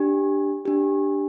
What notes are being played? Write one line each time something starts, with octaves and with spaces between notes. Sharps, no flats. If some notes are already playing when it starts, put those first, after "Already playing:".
Already playing: D4 G4
D4 G4